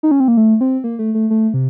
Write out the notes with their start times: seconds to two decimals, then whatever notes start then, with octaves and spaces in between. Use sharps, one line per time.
0.03 D#4
0.11 C#4
0.20 C4
0.28 A#3
0.37 A3
0.61 C4
0.84 A#3
0.99 A3
1.15 A3
1.30 A3
1.54 C3